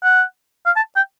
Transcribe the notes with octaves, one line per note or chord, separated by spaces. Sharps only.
F#5
F5
A5
G5